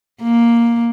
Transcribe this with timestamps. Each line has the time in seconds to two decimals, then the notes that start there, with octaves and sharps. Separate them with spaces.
0.22 A#3